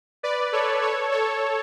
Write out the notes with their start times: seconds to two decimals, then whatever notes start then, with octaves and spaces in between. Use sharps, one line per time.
0.23 B4 D5
0.52 A4 C#5
0.82 A4 C#5
1.11 A4 C#5